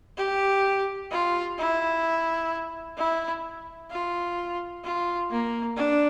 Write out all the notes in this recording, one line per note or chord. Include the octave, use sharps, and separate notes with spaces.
G4
F4
E4
E4
F4
F4
A#3
D4